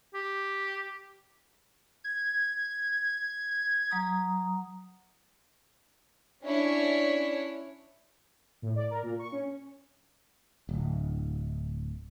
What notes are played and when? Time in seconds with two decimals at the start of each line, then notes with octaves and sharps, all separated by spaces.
0.14 G4
2.04 G#6
3.91 F#3 A#5 D#6
6.43 C#4 D4 E4 C#5
8.62 A2
8.76 D5
8.90 A#4
9.03 A#2
9.19 C#6
9.32 C#4
10.69 D1